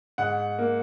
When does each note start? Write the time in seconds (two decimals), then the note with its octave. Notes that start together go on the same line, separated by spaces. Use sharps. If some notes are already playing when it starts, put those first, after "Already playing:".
0.18 G#2 F#5
0.59 A#3